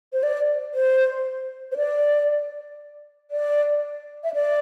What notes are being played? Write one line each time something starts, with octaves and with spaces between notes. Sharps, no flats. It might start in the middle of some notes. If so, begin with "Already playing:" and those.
C5
D5
C5
C5
D5
D5
E5
D5